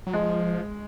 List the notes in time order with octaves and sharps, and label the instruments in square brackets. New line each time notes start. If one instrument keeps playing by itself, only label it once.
[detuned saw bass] F#3
[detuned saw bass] F3 [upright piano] G#3